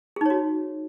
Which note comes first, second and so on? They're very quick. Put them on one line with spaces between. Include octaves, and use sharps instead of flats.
G#4 D#4 C#5 F#4